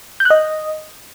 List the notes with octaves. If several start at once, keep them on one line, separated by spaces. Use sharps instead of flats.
G6
F#6
D#5